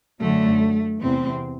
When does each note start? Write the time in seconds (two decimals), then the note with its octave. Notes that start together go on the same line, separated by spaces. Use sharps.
0.19 F#2 D3 F#3 A3
1.00 E2 C3 E3 C4